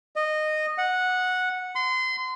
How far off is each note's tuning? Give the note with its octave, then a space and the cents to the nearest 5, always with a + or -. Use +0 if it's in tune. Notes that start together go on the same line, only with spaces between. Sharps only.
D#5 -15
F#5 -10
C6 -30